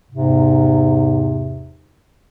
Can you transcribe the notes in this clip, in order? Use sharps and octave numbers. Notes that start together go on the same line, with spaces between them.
E2 G#2 C3